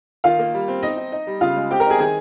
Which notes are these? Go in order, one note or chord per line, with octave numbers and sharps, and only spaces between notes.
D#3 F4 F5
A#3
G3
C4
D#4 D#5
D#4
D#4
G3
C#3 F4 F5
G#3
C4 G4 G5
A#4 A#5
D#4 G#4 G#5
D#3 G#4 G#5